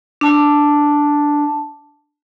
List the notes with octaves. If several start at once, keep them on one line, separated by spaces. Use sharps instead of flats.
D4 A5